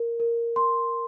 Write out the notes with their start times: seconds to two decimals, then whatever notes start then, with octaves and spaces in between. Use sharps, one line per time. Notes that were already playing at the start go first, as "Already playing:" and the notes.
Already playing: A#4
0.20 A#4
0.56 C6